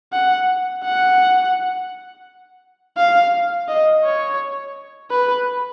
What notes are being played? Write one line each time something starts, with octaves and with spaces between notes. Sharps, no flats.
F#5
F#5
F5
D#5
C#5
B4